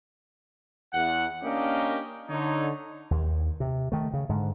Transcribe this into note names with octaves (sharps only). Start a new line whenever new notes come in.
E2 F#5
A#3 C#4 D4 G4 A#4 D#5
D3 D#4 C#5
D#2
C3
D#3 A3
C#3
G#2 D3